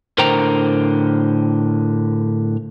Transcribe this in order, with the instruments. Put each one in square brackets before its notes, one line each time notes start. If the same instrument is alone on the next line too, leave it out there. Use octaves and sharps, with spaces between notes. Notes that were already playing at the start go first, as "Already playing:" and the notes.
[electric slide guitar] A2 D3 A#4 C5 G5 A#5